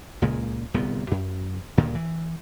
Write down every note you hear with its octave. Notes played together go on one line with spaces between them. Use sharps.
C#2 A#2 C#3 G#3
D1 C2 A#2 B3
F#2
D2 G2 A#2 D#3
E3